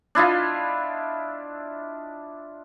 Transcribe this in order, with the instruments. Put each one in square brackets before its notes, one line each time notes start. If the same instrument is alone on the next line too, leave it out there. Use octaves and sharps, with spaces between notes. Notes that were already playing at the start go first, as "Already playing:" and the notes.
[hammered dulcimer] D4 E4 F4 D#5